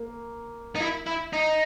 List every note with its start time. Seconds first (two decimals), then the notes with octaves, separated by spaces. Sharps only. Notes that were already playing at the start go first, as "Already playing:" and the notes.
Already playing: A#3
0.75 D#4
0.80 E4
1.07 E4
1.33 D#4